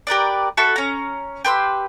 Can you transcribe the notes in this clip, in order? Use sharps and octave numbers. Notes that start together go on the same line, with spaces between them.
G4 A#4 B4 D5
F#4 A4 E5 B5
C#4 A#5
G4 B4 C6 E6